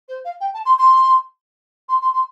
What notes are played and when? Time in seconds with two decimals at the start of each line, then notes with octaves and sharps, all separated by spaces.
0.08 C5
0.24 F5
0.40 G5
0.54 A5
0.65 C6
0.78 C6
1.88 C6
2.01 C6
2.13 C6